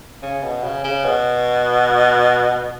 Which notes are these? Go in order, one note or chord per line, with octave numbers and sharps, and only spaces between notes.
C#3
B2
C#3
C#3
B2